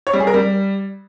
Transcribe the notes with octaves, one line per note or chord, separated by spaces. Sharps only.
C#5
G3
G#4
A#4
G3